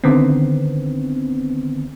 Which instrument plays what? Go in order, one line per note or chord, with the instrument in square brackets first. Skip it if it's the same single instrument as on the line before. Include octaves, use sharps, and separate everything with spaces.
[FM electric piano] D3 D#3 B3 C4